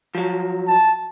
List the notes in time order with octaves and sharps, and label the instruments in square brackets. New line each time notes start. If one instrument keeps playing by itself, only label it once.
[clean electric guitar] F3 F#3
[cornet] A5